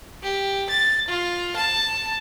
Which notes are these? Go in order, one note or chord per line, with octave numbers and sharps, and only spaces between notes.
G4
A6
F4
A5